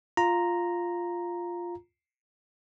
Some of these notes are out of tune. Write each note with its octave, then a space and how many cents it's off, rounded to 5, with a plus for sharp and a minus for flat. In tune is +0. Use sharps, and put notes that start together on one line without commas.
F4 +0 A#5 +0